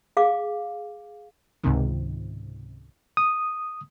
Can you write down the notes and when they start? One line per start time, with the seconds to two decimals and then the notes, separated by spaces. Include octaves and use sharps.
0.17 G#4 F5 D6
1.64 C#2 G#2 C3 D#3
3.17 D#6